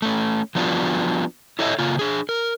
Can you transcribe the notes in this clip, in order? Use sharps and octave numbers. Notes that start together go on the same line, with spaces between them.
A3 C#4
F3 G3 B3 D4 F4 F#4
E4 A4 C#5 D#5 E5
C#3 A#3 F4
D4 G#4
A#4